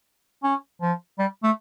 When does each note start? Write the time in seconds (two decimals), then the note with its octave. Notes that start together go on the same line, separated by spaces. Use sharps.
0.43 C#4
0.81 F3
1.19 G3
1.43 A3